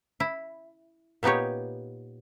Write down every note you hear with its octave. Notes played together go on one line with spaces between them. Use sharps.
E4
A#2 B3 D#4 G4 C#5